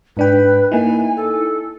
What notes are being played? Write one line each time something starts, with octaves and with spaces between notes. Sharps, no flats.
G#2 D4 B4 G5
A#3 D#4 E4 G#5
A4